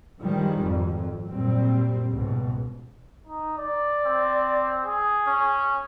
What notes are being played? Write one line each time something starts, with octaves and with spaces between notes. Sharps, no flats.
G2 D#3 F3 G3 G#3
G#1 F2
F#2 A#2 G3 C4
C#2 G#2 B2
D#4
D5
C4
G#4
C#4